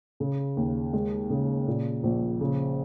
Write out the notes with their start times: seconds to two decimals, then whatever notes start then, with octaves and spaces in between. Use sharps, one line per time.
0.20 C#3
0.57 D#2
0.93 G#3
1.30 C#3
1.67 A#2
2.03 A#1
2.41 C#3